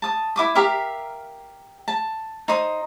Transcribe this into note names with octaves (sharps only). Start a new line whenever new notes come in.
A5 D#6
E4 D6 D#6
G4 A#4 E5 F5
A5
D#4 C5 D#6